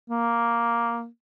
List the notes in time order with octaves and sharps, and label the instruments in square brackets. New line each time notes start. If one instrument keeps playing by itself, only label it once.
[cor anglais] A#3